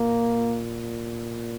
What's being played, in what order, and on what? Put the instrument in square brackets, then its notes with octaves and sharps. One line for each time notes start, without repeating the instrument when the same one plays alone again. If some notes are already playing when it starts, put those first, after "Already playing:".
Already playing: [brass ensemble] A#2 A#3